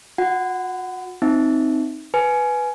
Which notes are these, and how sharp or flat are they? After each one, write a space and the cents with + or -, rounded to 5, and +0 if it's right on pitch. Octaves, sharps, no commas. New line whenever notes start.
F#4 -45 F#5 +5
C4 +0 D#4 +0 E5 -10
B4 +0 G#5 +20